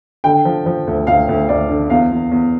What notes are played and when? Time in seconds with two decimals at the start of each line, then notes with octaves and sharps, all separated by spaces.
0.24 D3 G5
0.45 F3
0.66 F3
0.87 D2
1.07 D2 F5
1.29 D2
1.49 D2 D5
1.69 D3
1.90 E2 F5
2.12 E2
2.31 E2